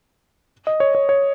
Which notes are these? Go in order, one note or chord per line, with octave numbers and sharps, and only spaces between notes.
D#5
C#5
C#5
C#5